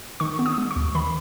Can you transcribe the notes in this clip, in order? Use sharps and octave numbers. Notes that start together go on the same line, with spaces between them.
D#3 C#6
B3
D#6
G#3
C#6
D#2
D#3 B5